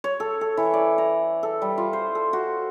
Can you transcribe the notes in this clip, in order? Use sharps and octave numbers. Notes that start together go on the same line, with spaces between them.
C#5
A4
A4
E3
D5
A#5
A4
G3
F4
C5
A4
F#4